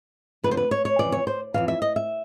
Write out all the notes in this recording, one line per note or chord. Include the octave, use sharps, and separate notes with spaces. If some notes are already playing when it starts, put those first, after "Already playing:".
F2 D3 B4
C5
B4
C#5
C#5
F2 C#3 E3 D5
C#5
C5
F2 C#3 E3 F5
E5
D#5
E5